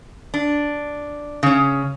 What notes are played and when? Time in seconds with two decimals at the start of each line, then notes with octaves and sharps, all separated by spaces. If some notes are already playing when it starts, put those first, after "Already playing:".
0.34 D4
1.43 C#3 C#4